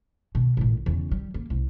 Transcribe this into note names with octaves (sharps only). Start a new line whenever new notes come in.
B2
A1 A#2
E2 C#3
G3
A#3
C2